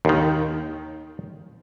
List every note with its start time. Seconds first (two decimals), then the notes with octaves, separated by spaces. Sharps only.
0.05 D#2 D#3